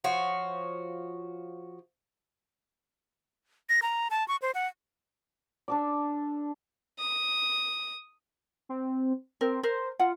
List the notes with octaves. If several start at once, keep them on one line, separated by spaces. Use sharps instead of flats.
F3 F#4 C#5
A#6
A#5
A5
C#6
C5
F#5
D4 A4 D5
D#6
C4
C4 A#4
A#4 C5
F4 F#5